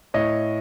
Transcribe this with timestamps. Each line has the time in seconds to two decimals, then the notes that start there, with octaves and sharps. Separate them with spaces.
0.14 A2 C#5 D#5